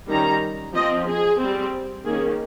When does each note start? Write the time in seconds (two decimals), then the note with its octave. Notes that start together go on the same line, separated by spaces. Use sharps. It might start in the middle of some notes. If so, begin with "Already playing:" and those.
0.10 D#3 G3 C#4 A#5
0.75 F3 C4 D#5
1.07 G#4
1.40 G3 C4
2.05 D#3 A#3 C#4 G#4